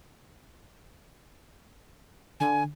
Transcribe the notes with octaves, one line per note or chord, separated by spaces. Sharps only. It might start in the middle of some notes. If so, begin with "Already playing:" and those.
D3 G#5